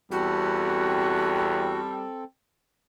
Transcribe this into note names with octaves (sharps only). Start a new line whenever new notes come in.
E2 G3 C4 F#4 A4